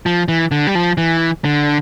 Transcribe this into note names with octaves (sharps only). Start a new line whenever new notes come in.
F3
E3
D3
G3
F3
E3
D3